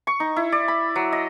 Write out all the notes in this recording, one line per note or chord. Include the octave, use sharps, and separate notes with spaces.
C#6
D#4
E4
D5
B5
F#3
D#5